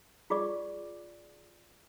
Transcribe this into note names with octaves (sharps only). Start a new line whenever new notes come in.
F4 G#4 D5 C#6